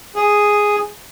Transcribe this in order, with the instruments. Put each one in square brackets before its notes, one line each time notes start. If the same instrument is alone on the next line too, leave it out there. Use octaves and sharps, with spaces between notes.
[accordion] G#4